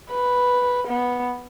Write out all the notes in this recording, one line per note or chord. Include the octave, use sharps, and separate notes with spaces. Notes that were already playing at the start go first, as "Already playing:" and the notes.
B4
B3